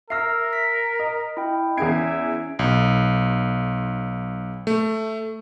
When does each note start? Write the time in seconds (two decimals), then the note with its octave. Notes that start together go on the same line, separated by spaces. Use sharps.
0.10 A#4 E5 E6 F6 A#6 C7
0.53 B6
0.99 D#5
1.37 E4 G5
1.77 E2 C#4 G#4 E5 G#6 C7 D7
2.59 B1
4.67 A3